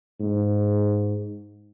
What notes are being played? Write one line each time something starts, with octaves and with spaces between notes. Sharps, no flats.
G#2